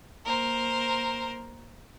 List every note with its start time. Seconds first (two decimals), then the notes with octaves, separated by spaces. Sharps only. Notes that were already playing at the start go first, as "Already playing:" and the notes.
0.24 A#3 A#4 C5